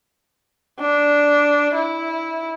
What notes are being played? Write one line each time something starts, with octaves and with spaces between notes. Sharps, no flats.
D4
E4